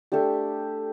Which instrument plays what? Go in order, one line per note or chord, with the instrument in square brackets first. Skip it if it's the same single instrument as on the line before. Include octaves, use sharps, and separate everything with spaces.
[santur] A3 D4 G4